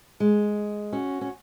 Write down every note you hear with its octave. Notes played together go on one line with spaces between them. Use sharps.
G#3
C#4 F#4
C#4